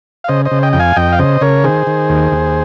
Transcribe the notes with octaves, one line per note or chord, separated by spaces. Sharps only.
F5
C#3 C5 D#5
C5 D#5
C#3
D#5 G5
F2 G5
F5 G#5
F2 D#5 G5
F5
C#3 C5 D#5
C#3 A#4 C#5
D#3 G#4 C5
D#3
D#2
D#2